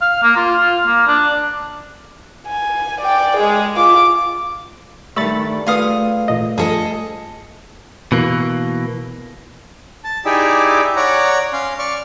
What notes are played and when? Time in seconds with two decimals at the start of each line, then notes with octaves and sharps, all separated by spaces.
0.02 F5
0.23 A#3
0.37 F4
0.60 F4
0.87 A#3
1.08 D4
2.47 G#5
3.01 D5 G5
3.37 G#3 G#4
3.76 F4 D6
5.16 G2 D#3 A3 E5 B5 C#6 A6
5.66 A3 F4 G#4 A4 B4 F5 D#6
6.28 A1 A#2 D#5
6.58 G2 F3 G#4 A4 D#5
8.12 B2 E3 A#3
10.04 A5
10.25 D#4 E4 G4 G#4 D5 E5
10.96 C#5 D5 F#5 A#5
11.53 C#4 F5 C6
11.79 D5 C#6 F6